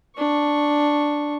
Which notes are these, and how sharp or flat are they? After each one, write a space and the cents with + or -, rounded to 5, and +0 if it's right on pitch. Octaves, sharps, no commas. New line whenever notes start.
D4 +0 C#6 -5